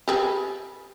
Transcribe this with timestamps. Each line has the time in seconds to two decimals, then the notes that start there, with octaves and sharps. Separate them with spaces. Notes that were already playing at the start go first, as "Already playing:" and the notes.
0.08 G4 G#4 B4